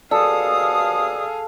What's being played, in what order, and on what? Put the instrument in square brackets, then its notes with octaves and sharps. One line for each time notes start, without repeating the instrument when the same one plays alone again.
[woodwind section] D#2 B2 D#6 [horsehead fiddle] G#4 F5 [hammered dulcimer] A4 [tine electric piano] D5